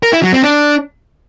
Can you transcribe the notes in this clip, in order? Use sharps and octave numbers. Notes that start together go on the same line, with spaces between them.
A#4
E4
F#3
C4
D4